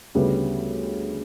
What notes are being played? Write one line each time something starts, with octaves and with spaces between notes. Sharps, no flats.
D2 C#3 G3 B3